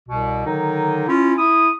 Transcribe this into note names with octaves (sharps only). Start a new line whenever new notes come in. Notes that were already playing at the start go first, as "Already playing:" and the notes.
C2 B2
D3 D#3 F#3 D#4
C#4 E4 F4
E4 D#6